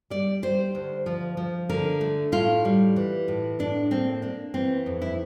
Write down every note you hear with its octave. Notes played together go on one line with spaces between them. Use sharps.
G3 D5
G3 C5
D2
F3
F3
D3 A#4
A3
A2 F4
G3
E3
A2
A2 D4
A#3 C4
A#3 D4
E3 C4
F2
E4